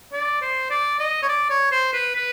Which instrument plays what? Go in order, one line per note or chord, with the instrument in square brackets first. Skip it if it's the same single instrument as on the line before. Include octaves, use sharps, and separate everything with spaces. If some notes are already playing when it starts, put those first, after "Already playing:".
[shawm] D5
C5
D5
D#5
C#5
D5
C#5
C5
B4
B4